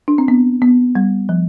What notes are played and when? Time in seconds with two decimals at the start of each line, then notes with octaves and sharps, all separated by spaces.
0.08 D4
0.18 C4
0.28 B3
0.62 B3
0.95 G3
1.29 F3